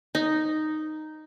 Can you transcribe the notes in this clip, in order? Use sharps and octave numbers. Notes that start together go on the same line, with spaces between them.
D#4